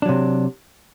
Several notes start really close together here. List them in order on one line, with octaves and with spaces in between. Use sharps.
D4 F#3 C3